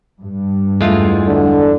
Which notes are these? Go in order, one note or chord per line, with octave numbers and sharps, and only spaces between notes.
G2
E2 G#3 A3 F4
D3